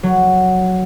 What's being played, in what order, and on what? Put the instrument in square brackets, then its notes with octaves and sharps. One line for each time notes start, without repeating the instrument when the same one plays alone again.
[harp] F#3